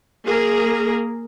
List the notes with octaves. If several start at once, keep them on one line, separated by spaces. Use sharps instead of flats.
A#3 G#4 A#4